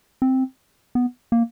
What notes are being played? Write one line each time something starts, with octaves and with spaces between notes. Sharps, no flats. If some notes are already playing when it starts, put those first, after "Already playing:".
C4
B3
A#3